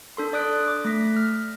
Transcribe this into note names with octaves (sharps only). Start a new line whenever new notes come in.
D4 A4 C6
D5 D#6 F#6 D7
D6
A3 A#6 B6
F6